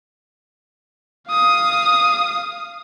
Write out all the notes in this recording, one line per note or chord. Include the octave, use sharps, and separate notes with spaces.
F5 D#6